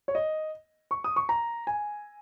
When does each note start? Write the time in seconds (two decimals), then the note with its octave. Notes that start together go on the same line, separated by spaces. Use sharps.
0.08 C#5
0.15 D#5
0.91 C#6
1.04 D#6
1.16 C#6
1.29 A#5
1.67 G#5